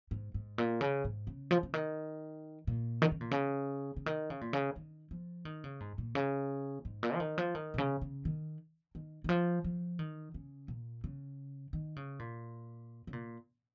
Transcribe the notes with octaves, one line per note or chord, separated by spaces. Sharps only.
G#2
G#2
A#2
C#3
G#2
C#3
F3
C#3
D#3
A#2
D#3
C#3
A#2
C#3
C#3
D#3
C#3
A#2
C#3
D#3
F3
D#3
C#3
G#2
A#2
C#3
G#2
A#2
F3
D#3
F3
D#3
A#2
C#3
C#3
D#3
D#3
D#3
F3
F3
D#3
C#3
A#2
C#3
D#3
C#3
A#2
C#3
A#2